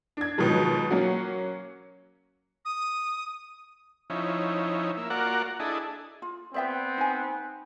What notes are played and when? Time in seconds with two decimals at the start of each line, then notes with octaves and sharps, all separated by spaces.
0.17 D4 G#6
0.38 G#2 B2 D#3 F3 F#3 G#3
0.90 F#3 A#3 C#4 F#4
2.65 D#6
4.10 F3 C#4 D#4 E4
4.97 A#3 E5
5.10 A#3 F4 F#4 A#4 D5 F#5
5.60 D4 E4 G#4 A4 D#5
6.22 F4
6.54 B3 C4 D5 E5 G5
6.98 D#4 G#5